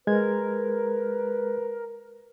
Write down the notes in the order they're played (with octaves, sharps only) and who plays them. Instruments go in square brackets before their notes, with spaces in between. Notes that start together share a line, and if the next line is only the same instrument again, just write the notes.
[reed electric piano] G#3 G#6 [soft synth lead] A#4 [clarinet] B4